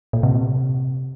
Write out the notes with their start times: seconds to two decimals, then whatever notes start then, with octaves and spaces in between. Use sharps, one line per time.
0.13 A#2
0.23 C3